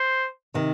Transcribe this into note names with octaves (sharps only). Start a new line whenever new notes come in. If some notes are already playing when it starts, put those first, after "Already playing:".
Already playing: C5
C3 D#3